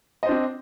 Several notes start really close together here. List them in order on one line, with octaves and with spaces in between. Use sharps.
D#5 C5 D4 C4